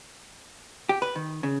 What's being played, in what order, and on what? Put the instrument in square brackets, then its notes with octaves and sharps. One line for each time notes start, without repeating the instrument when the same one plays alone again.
[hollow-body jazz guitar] G4
B4
D#3
C#3